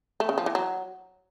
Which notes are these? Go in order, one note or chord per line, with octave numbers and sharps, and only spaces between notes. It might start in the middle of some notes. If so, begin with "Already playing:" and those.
A3
C#3
F3
E3
F#3